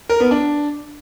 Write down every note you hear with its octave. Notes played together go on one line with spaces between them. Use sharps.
A#4
B3
D4